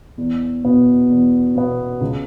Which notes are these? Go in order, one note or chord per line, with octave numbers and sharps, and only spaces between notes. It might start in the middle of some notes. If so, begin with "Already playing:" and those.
E2
B2 B3
E2
B2 B3
C#2